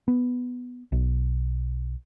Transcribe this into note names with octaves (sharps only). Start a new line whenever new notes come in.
B3
B1